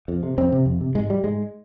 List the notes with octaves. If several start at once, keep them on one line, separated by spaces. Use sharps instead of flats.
F2
C3
F2 C4
C3
F2
C3
G#2 G#3
G3
G#2 G#3